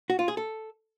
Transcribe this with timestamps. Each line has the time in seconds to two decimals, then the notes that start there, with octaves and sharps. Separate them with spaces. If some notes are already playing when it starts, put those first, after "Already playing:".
0.10 F#4
0.19 F4
0.28 G#4
0.37 A4